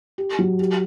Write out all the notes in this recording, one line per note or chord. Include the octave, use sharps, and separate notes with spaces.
G4
F#3
G4